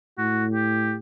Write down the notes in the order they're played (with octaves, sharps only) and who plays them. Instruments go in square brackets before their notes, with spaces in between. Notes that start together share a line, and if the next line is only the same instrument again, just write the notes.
[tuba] A2 [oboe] F#4
[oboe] G4